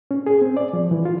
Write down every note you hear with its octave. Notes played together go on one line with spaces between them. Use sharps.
C#4
G#4
C4
D5
F3
E3
F4